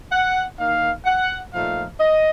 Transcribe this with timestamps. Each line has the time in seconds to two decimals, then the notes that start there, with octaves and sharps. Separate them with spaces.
0.11 F#5
0.58 D#3 A#3 D#4 F5
1.05 F#5
1.52 A#2 F3 A3 D#4 F5
1.99 D#5